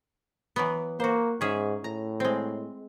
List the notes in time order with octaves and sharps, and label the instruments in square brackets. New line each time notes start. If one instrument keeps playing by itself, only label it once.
[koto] E3 F#3 B3
[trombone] A#3 [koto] F#4 C5
[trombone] G#2 [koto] C#4 G#4 E5
[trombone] A2 [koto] A#5
[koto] G#3 C4